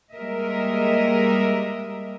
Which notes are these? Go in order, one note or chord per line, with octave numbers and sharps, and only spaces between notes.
G3 G#3 A#3 A#4 D#5 E5